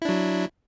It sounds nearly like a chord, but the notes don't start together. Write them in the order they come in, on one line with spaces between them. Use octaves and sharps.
E4 D4 F#3